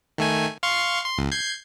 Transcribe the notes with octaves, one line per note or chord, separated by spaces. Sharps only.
D#3 A3 G#5
F5 C6 C#6
C6
C#2
G6 G#6 C7